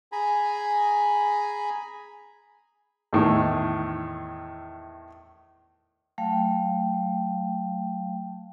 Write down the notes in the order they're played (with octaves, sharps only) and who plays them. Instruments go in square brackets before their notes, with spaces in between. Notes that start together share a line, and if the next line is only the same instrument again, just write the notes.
[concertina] G#4 G#5 A#5 B5
[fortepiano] E2 A2 D#3
[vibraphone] F#3 A3 F5 G5